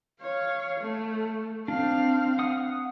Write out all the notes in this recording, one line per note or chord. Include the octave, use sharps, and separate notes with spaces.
C#5 F5
A3
C4 D4 F5
F#5 D#6